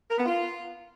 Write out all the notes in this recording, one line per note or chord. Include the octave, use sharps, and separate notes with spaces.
A#4
B3
F4